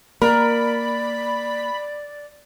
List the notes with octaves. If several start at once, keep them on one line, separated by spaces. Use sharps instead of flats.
A#3 A#4 D5 B5